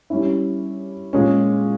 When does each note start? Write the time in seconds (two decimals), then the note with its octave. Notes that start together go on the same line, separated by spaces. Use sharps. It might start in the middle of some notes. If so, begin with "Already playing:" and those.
0.10 G3 C#4 E4
1.13 A#2 G#3 C#4